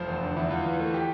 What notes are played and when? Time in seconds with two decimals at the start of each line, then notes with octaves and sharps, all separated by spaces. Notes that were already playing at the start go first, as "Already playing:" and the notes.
Already playing: F1 F3 C5
0.08 E2
0.22 D3
0.37 E2 E4
0.50 E2 F4
0.65 E3
0.80 A3
0.94 G4